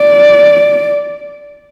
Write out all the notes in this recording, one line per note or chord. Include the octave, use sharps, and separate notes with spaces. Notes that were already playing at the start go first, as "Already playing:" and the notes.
Already playing: D5